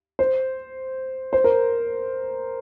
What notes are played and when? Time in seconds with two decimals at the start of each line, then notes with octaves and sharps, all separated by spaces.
0.19 C5
1.33 C5
1.44 A#4